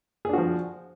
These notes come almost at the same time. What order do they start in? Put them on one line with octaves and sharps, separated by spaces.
G#4 D4 F#4 F3